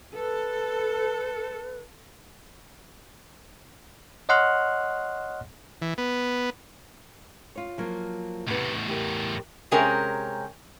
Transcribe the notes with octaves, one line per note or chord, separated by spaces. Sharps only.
A4 B4
C#5 D#5 F#5 C6 F6 F#6
E3
B3
F4 C#5
F3 F#3 A#3
E2 A2 C3 B3
G4 A#4
C3 G#3 C#4 G4 A#4